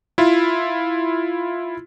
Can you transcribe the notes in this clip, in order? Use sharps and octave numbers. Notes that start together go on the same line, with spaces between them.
E4 F4